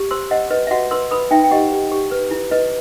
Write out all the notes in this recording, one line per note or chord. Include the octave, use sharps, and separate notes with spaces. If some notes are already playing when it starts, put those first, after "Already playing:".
Already playing: G4
C5 C6 E6
C5 D#5 F#5
B4 D#5
E5
F#4 D#5 F#5
B4 C6 E6
B4 B5 D#6
D#4 E5 G5
G5
G4 D#5 F#5
G4
G4
B4
E4
B4 D#5